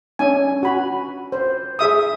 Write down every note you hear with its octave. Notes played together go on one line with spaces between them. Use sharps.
C#4 D4 G#5
F#4 B5
C5
G#4 E5 D#6